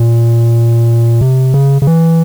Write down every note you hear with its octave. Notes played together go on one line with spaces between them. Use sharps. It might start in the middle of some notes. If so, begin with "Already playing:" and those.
Already playing: A#2
C3
C#3
C#3
E3